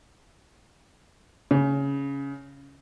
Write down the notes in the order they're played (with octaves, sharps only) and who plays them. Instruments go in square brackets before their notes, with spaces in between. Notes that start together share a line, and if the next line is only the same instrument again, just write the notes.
[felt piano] C#3